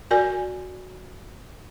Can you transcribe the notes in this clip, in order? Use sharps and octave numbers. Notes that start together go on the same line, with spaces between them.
F#4 A#4 D5 G#5